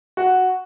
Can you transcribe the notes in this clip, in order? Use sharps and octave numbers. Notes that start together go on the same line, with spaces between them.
F#4